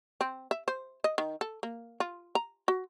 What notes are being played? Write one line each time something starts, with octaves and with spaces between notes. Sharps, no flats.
C4
E5
C5
D#5
D#3
A4
A#3
F4
A#5
F#4